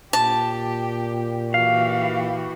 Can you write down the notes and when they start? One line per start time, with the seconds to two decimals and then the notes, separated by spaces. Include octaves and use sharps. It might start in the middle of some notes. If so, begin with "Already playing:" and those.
0.13 A#2 G4 A5
1.54 E3 F#4 G4 F5